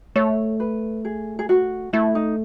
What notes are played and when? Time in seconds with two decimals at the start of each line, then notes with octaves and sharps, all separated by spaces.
0.16 A3 C#5
0.60 B4
1.05 G#4
1.39 G#4
1.49 F#4
1.93 A3 E4
2.15 D#4